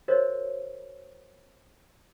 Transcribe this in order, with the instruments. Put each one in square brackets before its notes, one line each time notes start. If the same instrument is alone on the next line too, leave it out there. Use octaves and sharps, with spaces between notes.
[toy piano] F#4 A#4 C5 C#5 D#5